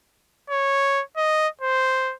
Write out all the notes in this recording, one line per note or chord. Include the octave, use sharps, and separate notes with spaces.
C#5
D#5
C5